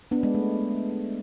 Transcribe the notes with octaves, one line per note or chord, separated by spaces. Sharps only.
B3 D4
G#3 B3
A3